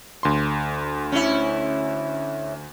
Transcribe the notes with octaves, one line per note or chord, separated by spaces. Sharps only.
D2 C6
C#4 E4